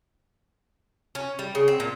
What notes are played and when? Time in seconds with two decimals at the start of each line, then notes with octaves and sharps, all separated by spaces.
1.15 C#4
1.39 G3
1.55 C#3
1.68 C4
1.80 A#2